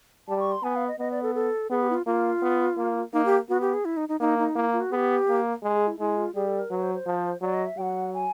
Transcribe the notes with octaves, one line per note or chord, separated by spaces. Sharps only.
G3 A5
C#6
C6
B3 G#5
F5
D#5
B3 D#5
D5
A4
A4
B3 G#4
G4
E4
F4
A#3 F4
B3
A#3
A#3 D#4
G4
B3 F#4
G4
G#4
E4
D#4
D#4
A#3 D#4
D#4
A#3 E4
F4
F#4
B3 G4 G#4
A#3
G#3 G#4
G#4
E4
G#3 E4
F4
G3 G#4
A4
A#4
F#3 B4
C5
C5
F3
F#3 D5
D#5
E5
F#3 F#5 G5
G#5